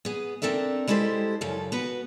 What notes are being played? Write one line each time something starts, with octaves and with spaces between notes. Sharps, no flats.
B3 G#4
C4 D4 A4 A#4 E5
G3 G#3 E4 G4 A4 C5
F#2 C#3 F3 A4
B3 F#4 B4